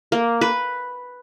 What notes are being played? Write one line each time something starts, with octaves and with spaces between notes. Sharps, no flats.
A#3
B4